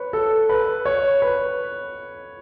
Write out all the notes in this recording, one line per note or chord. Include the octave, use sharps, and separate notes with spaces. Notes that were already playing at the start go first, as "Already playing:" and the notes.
Already playing: B4 C#5
A4
B4
C#5
B4